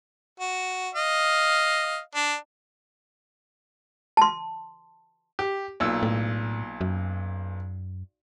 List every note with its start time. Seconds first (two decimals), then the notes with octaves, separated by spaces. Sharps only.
0.40 F#4
0.94 D#5 F5
2.15 D4
4.17 A5 C6
5.39 G4
5.80 B1 A#2 E6
6.03 A2
6.81 F#2